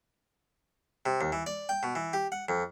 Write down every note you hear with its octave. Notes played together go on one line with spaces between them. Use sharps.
C3
D#2
E3
D5
G5
B2
E3
G4
F#5
F2